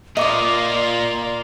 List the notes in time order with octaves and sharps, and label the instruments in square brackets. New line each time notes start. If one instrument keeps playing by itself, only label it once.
[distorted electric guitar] A#2 [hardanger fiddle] A#3 F4 [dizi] D5 [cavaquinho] D#5 D6 D#6